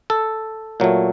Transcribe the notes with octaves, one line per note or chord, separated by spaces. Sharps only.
A4
A#2 F#3 A3